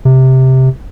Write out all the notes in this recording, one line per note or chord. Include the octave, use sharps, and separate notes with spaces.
C3